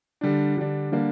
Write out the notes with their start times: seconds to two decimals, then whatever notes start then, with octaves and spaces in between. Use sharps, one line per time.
0.21 D3 G3 D4
0.57 D3 G3 D4
0.92 D3 G3 A#3 D4